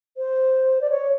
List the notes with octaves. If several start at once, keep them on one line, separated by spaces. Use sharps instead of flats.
C5
D5
C#5